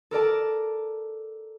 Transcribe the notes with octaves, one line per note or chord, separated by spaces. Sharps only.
A4 A#4 D5 A5